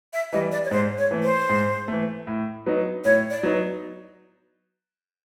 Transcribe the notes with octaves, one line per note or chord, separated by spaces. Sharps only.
E5
E3 G3 D#5
D5
C#5
G#2 C5
C#5
E3 A3
C5
G#2
E3 A3
A2
F#3 B3 D#4
A2 C#5
D5
F#3 B3 D#4